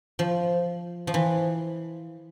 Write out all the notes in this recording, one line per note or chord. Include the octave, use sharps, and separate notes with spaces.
F3
F3
E3